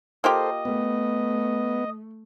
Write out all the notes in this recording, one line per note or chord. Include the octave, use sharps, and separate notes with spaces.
A#3 F4 G4 A4 C5 D#5
A3 B3